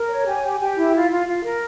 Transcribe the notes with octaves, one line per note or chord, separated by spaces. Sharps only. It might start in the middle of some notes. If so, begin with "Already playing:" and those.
Already playing: A#4
C#5
G4 G#5
G4
G4
E4
F4
F4
F4
A#4